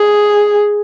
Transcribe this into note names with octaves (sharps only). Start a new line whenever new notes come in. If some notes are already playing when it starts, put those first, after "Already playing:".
Already playing: G#4